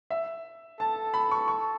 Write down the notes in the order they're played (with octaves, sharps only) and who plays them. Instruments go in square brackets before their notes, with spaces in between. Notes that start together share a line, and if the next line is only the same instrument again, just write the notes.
[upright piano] E5
[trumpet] A4 [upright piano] A5
[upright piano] B5
C#6
C#6